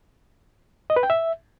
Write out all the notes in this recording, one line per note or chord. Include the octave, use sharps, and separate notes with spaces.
D#5
B4
G5
E5